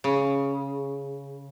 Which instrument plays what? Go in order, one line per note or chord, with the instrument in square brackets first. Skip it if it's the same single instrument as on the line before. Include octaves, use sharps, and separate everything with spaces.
[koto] C#3